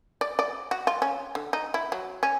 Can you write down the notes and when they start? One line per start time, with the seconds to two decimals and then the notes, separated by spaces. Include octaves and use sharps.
0.21 D5
0.39 D5
0.71 F#4
0.87 F4
1.02 C#4
1.35 D3
1.53 D#4
1.74 E4
1.92 F#3
2.23 C#4